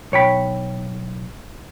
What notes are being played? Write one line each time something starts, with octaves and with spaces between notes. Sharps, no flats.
B1 C#5 G5 B5